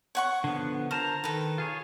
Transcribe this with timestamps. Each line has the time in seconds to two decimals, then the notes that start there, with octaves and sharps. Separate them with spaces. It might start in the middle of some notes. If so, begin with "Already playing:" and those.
0.15 C#5 F#5 C#6
0.44 D3 F3 B3
0.91 A#4 C5 A5 A#5
1.24 D#3 A4 B4
1.58 F4 G#4 C#5